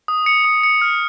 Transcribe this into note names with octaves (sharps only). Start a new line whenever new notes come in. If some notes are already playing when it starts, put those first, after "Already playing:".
D#6
C#7
D#6
C#7
F6